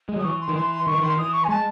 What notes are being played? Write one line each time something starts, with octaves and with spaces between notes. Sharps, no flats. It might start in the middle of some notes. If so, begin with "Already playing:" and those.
G#3
F#3 D#6
E3 C#6
C6
D#3
E3 C6
C6
D#3 C#6
E3
D#3 C6
E3 D#6
C#6
G#5
G#3 A5